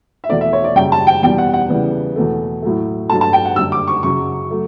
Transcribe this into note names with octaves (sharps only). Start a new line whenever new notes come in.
E5
E2 B2 A3 D5
E5
C#5
D5
F#2 C#3 G3 G5
A5
G5
E2 B2 G3 G5
F#5
F#5
C#3 E3 G3 B3
E2 B2 A3
A2 F#3 A3
G2 F#3 A3 A5
A5
G5
F#5
F#2 D3 G3 E6
D6
C#6
F#2 C#3 F#3 C#6
F#3 A3